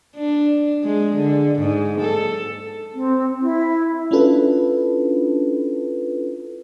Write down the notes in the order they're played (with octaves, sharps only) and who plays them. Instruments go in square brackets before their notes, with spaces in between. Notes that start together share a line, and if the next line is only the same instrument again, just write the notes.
[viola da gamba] D4
G#3
D3
G#2
A4
[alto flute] C4
E4
[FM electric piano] C#4 D4 E4 F4 A4 B4